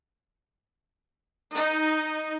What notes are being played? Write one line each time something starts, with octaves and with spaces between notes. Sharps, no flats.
D#4